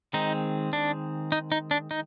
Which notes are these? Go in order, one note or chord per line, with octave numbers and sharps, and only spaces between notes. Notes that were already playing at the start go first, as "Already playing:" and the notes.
D#3 G#3 C4 D#4
D4
D#4
D#4
D4
D#4